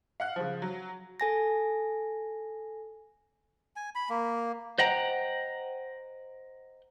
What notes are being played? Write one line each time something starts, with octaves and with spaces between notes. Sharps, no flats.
F5 F#5 F#6
C#3 F3
F#3
A4 G#5 A#6
G#5
B5
A#3
C5 D#5 F#5 G5 A#5